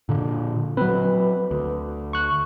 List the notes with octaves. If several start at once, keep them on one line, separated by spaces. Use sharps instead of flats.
A#2 D3
F#3 C4 B4
D2
C#6 F#6